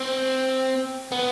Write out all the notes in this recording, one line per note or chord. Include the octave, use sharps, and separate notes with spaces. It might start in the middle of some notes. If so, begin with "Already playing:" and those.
Already playing: C4
B3